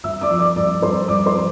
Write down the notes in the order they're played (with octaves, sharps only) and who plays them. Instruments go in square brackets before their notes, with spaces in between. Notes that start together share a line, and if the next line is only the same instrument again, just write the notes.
[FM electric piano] G2 [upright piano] E5 E6
[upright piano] D5 D6
[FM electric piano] F3
[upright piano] D5 D6
[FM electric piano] G2 [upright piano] D5 D6
[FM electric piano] G2 [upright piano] C5 C6
[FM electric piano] G2 [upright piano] D5 D6
[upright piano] C5 C6
[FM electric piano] F3